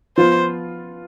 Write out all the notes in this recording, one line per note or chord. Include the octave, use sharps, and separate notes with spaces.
F3 B3 F4 C5